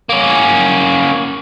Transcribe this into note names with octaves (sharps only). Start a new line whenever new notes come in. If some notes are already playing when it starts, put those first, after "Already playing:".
A#3 C#4